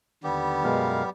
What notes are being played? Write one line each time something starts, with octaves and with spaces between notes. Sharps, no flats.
D#2 D3 G3 B3 G4
F#2 B2 G#3 A#4 F5